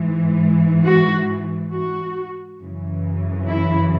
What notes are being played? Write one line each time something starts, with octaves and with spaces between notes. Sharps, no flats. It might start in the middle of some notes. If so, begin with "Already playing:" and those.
Already playing: G#2 E3
F#4
F#4
F#2 C#3 E3
E4